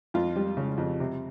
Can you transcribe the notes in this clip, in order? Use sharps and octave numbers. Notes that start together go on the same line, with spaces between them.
F2 F4
G3
C#3
F2
C3